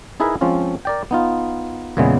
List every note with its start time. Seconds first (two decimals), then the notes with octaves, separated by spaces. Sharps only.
0.20 D#4 E4 G#4 A#4 B4 E5
0.41 F3 G#3 C4 C#4 F4
0.85 A#4 D5 G5
1.11 B3 D#4 F4
1.97 E2 A#2 C#3 E3 G#3 B3